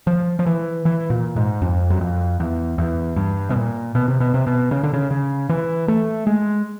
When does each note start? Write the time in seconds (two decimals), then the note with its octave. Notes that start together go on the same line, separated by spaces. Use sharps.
0.07 F3
0.39 F3
0.46 E3
0.85 E3
1.10 A#2
1.36 G#2
1.62 F2
1.90 F#2
2.01 F2
2.40 E2
2.78 E2
3.16 G2
3.50 B2
3.56 A#2
3.95 B2
4.08 C3
4.20 B2
4.34 C3
4.47 B2
4.71 C#3
4.83 D3
4.93 C#3
5.11 C#3
5.49 E3
5.88 A3
6.27 G#3